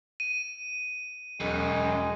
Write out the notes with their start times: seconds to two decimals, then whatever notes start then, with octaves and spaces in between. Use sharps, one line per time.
0.20 D#7
1.40 E1 F#2 G#3